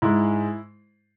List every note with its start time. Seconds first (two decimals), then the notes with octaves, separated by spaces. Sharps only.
0.02 G#2 G#3 E4